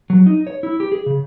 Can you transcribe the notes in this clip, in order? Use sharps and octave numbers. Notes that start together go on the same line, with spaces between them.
F#3
D#4
C#5
E4
G4
G#4
C#3